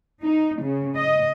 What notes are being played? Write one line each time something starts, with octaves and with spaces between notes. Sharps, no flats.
D#4
C#3
D#5